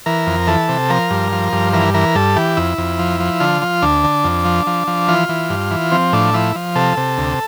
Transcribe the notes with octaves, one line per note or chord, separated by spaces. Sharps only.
E3 A#4
F2
E3 A4
C3
F3 A#4
G2
F3
G2
E3 A#4
E3 A#4
G2 A4
E3 G4
F2 E4
F2
F3
F3
D3 F4
F3
D2 D4
D3
F2
F3
F3
F3
E3 F4
E3
G2
E3
F3 C4
A2 D4
F3 E4
F3
C3 A4
C3
D2